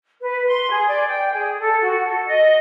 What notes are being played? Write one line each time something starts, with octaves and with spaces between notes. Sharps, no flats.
B4
C6
G#4
D5
G5
G#4
A4
F#4
A4
D#5